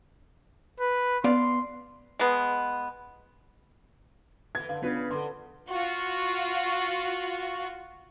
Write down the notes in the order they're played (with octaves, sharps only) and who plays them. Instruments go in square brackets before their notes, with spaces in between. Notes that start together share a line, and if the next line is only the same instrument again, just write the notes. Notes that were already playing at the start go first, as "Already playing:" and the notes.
[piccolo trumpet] B4
[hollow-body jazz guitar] B3 D5 F5 [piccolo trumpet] C6
[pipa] G#3 B3
[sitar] E3 B3 [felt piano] G#6
[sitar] D3 [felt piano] F5
[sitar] C#3 B4 [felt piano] B3 D4 F4
[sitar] D3 [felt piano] A4 C6
[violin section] F4 F#4